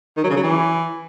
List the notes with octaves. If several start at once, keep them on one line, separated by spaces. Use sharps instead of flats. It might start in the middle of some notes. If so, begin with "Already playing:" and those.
D#3
F#3
C#3
F#3
E3